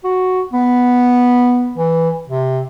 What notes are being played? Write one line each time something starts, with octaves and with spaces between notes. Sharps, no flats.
F#4
B3
E3
C3